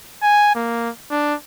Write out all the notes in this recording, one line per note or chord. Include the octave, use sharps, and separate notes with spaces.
G#5
A#3
D4